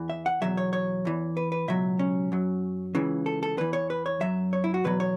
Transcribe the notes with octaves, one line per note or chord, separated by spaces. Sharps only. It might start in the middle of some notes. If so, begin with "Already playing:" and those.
Already playing: E2 E3
E5
F#5
E2 B2 F#3 E5
C#5
C#5
E2 E3
B4
B4
C#2 B2 F#3 E5
C#4
F#2 F#3
C#2 C#3 E3
A4
A4
E2 E3 B4
C#5
B4
C#5
F#2 F#3 E5
C#5
E4
F#4
E2 B2 F#3 B4
C#5